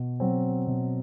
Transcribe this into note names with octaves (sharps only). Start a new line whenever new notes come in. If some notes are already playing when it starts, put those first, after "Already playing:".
Already playing: B2
F#3 C4
B2